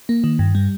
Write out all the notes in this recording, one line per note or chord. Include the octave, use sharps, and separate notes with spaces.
A#3
D#3
G2
G3